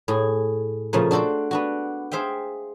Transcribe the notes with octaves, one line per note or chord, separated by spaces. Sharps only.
A2 G#4
A#2 C#3 F3 A3
D4 F#4 A4 C5 D5
B3 D4 F#4
G#4 C5 E5 F5 G5